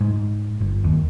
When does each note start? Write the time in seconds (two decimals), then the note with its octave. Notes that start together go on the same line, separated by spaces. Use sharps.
0.01 G#2
0.61 G1
0.84 D#2